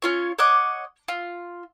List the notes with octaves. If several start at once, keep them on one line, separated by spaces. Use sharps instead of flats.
C#4 F4 C#5
C#5 D#5 F#5 D6
F4